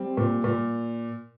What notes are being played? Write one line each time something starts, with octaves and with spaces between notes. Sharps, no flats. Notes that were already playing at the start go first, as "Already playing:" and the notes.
Already playing: G3 C4
A#2
A#2